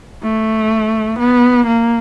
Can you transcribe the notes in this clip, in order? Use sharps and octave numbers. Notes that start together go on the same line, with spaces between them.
A3
B3
A#3